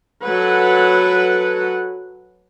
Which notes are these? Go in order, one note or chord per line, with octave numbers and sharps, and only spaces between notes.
F#3 A4 B4 F#5